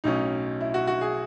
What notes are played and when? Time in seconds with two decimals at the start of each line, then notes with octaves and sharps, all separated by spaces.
0.04 B1 A2 F#3 C#4 D#4
0.61 E4
0.74 F#4
0.87 F#4
1.01 G#4